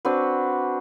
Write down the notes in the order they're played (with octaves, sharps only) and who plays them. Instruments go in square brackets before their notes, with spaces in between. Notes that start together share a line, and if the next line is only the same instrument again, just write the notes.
[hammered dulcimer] C4 D4 F#4 B4